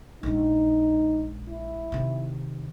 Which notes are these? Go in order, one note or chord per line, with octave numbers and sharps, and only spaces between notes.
A#1 G#3 D#4
E4
C3 D#3